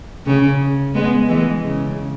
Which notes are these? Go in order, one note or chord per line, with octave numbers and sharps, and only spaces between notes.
C#3
G#3 B3
E3 G#3
C#3